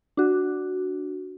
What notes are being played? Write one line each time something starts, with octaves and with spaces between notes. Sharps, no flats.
D4 F#4